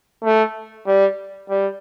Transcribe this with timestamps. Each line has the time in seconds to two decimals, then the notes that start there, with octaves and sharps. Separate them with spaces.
0.24 A3
0.87 G3
1.49 G3